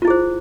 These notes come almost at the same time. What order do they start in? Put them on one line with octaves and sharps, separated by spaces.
F4 E4 G#4 C5